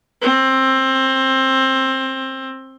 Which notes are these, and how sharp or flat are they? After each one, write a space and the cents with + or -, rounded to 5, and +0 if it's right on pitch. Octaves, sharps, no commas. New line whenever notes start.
C4 +20